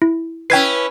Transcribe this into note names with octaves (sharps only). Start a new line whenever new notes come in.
E4
C#4 E4 B4 G5 G#6 C7